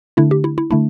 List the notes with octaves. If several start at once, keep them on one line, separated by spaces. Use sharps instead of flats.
D3 A3 D4 E4
G4
E4
E4
D3 A3 D4 E4